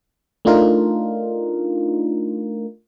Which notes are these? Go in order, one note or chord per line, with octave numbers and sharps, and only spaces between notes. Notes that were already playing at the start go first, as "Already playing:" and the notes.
A3 D4 D#4 F4 A#4